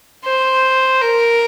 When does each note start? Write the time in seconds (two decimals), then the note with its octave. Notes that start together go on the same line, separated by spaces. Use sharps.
0.25 C5
1.01 A#4